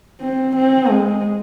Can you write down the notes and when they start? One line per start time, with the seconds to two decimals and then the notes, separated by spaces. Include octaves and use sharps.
0.21 C4
0.56 C4
0.89 G#3